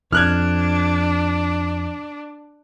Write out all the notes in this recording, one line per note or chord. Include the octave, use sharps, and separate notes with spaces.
F2 D4 F6 F#6 G#6